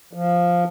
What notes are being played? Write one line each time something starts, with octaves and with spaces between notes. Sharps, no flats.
F3